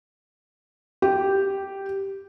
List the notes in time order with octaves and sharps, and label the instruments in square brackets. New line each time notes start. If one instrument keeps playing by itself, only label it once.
[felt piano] G4